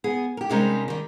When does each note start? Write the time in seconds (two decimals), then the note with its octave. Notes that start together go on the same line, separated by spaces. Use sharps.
0.04 B3 G#4
0.37 G4 A#4
0.50 C3 G3 G#3 C#4 D#4 A#4
0.88 D#3 G3